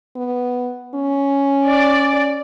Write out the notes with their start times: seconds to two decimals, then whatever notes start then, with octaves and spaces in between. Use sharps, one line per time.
0.16 B3
0.95 C#4
1.67 D5